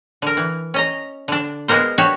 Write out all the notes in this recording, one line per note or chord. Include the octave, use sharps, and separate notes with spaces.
D3 A#4
E3
C#4 D#5 A#5
D3 D4
G#3 A#3 B3 A#4 C5
D4 F#4 G4 C#5 E5